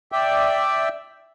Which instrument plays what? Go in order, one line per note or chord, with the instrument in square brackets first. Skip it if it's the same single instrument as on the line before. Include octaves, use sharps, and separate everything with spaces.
[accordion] D5 E5 G5